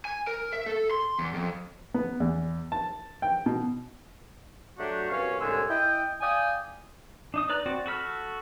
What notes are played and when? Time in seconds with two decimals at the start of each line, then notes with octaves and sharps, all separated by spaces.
0.05 G#5
0.27 A#4
0.53 E5
0.66 A4
0.91 C6
1.19 E2
1.34 F2
1.94 B3
2.20 E2
2.72 A5
3.22 G5
3.46 B2
4.79 F#3 A3 D4 F#4 G4
5.10 C2 B2 C#4 C#5 F5
5.40 C2 A2 D3 G#3 G#5 E6
5.69 E4 D#5 G5
6.21 D5 F5 G5 G#5 D#6
7.34 D4 D#4 D#6
7.49 B4 D5 A#5 F#6
7.66 C4 F#4 D5
7.86 F#4 A4 B5 F6